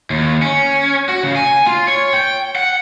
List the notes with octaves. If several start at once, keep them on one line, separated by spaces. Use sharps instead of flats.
D#2
C#4
F#4
C#3
G#5
F4
C#5
G5
F#5